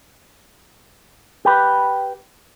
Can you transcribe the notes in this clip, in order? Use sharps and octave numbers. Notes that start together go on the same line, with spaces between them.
G4 B4